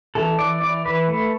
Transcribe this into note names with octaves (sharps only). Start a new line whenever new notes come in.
E3 A4
E3 D5
E3 D5
E3 B4
A3